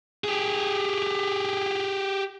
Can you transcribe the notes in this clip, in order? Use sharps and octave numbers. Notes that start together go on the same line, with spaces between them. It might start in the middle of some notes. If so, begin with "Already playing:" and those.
G4 G#4